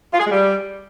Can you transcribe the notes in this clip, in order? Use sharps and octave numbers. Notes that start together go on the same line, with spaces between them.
F4
G#4
G#3
G3